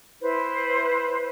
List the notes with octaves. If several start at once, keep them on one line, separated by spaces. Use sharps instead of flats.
E4 B4 C5